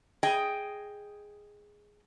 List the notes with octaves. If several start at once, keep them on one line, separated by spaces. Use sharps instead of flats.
G#4 D#5 G5